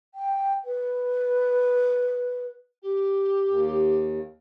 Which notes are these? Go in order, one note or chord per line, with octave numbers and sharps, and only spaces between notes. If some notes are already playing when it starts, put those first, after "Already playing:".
G5
B4
G4
D#2